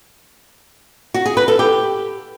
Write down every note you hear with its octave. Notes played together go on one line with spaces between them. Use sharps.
F#4
G#4
B4
A4
G4